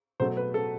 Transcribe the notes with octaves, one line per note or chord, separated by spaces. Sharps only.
B2 F#3 A3 C5
B4
A4